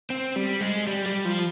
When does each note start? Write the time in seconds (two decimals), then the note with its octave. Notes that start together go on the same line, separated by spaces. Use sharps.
0.10 C4
0.36 G3
0.60 G#3
0.87 G3
1.06 G3
1.25 F3